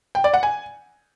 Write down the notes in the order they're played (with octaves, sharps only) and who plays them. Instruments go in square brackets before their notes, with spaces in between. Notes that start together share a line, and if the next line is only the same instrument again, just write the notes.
[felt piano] G5
D5
F#5
G#5